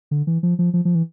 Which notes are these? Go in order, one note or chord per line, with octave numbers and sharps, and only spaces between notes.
D3
E3
F3
F3
F3
F3
E3